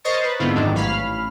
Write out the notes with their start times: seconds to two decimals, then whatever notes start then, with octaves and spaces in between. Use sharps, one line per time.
0.04 A#4 C5 C#5 D#5 C#6 A6
0.23 B4
0.40 G#2 D3 B3 C4 E4 F4
0.55 F2 G#2 D#3 F#3 D4
0.74 A1 C#4 F5 B5 F6